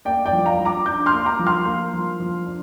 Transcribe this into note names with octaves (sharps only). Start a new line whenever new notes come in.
A#3 D5 G5
D5 G5
F3
F5 A#5
F3
A#5 D6
D4 D6 G6
C6 F6
A#3
A#5 D6
F3
C6 F6
A#3
F3
F3
D4